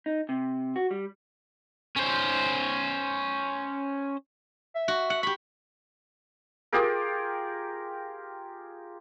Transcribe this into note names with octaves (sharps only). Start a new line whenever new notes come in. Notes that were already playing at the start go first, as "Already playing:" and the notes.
D#4
C3
F#4
G3
C#4 C5
E5
F#4
F#5
G4 B5 C#6
F4 G4 G#4 A#4